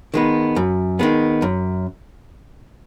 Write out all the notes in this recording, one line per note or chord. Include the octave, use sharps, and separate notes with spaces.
D#3 G#3 B3
F#2
D#3 G#3 B3
F#2